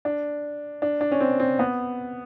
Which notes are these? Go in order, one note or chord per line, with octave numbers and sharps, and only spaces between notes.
D4
D4
D4
C#4
C4
C4
B3